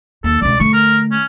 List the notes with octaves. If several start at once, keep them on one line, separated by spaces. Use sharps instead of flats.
D#2 A#3 A4
C#2 C3 D5
D3 A3 C#6
A#4
C#4